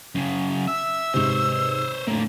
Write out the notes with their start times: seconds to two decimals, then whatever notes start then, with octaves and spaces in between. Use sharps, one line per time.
0.15 F#2 C#3
0.67 E5 E6
1.14 G#2 C3 C5 C#5
2.07 A2 D3 A#3